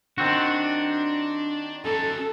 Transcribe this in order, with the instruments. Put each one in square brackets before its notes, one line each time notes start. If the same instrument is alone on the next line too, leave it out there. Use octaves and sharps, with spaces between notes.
[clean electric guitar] D#3 C4 F#4 [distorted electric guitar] D4
[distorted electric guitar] C#4 A#5 [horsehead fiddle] A4